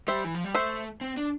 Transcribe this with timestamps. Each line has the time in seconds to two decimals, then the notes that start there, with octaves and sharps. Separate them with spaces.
0.08 G3 C5 E5
0.24 E3
0.34 F3
0.44 G3
0.54 A3 C5 E5
1.01 C4
1.17 D4